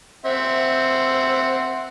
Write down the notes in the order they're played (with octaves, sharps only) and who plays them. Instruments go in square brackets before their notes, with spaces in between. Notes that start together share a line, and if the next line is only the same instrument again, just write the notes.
[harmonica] C4 E5 F#5